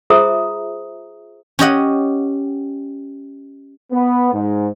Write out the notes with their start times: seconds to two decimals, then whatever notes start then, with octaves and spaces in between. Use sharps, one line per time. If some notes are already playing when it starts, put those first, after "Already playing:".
0.10 F4 G#4 C5 E5 A#5 D#6
1.59 C#4 G4 D#5 F#5
3.92 B3
4.33 G#2